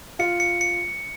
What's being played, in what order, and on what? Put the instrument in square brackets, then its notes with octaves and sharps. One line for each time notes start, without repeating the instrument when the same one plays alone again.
[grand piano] F4 [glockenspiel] C#7
[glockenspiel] C#7
C#7